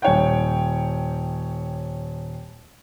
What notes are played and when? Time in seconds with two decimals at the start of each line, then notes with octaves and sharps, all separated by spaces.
0.02 D#1 C#5 G5